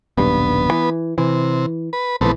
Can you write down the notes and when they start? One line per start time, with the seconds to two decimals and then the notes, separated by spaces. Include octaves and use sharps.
0.18 D#1 B1 G2 B3
0.71 E3
1.18 C3 E3
1.93 B4
2.21 A#1 E3 A3 B3 C4